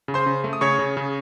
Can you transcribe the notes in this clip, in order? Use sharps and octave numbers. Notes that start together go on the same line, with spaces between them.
C#3
C5 C6
C#3
A3
D#6
C#3 C#5 C#6
C#3
C#3